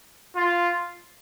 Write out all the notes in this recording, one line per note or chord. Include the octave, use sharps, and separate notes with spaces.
F4